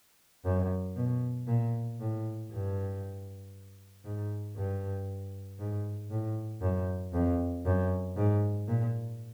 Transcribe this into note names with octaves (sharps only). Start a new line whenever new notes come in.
F#2
B2
A#2
A2
G2
G#2
G2
G#2
A2
F#2
F2
F#2
G#2
A#2